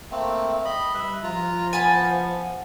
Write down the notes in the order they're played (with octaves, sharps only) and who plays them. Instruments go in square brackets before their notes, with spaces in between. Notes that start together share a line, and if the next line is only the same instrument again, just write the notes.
[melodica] A3 A#3 C4
D#5 B5
[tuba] G3 [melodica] B4 E5
[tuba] F3 [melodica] F4 A#5
[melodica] B3 [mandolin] G#5 A5 B5